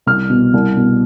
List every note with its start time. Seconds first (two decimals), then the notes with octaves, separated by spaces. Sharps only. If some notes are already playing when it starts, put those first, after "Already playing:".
0.06 C2 F6
0.30 B2
0.54 C2
0.77 B2